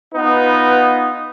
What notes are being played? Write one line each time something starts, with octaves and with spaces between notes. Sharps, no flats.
B3 D#4 F4 B4